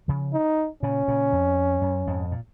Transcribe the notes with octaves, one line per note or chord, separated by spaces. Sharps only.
C#3 F3
D#4
A#2 C#3 C#4
A#2 C#3
F2
F#2
F2 G#2
A#2